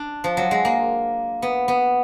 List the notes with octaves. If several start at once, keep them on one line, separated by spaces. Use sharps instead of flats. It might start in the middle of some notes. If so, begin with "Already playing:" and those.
Already playing: D4
F3
F#3
G#3
A#3
B3
B3